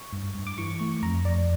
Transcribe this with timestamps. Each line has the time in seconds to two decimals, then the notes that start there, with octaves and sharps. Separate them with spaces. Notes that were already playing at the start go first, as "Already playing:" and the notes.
Already playing: C#6
0.13 G2
0.35 G2
0.47 D6
0.58 E3 C#6
0.80 A3 C#6
1.02 F2 A#5
1.25 F2 D5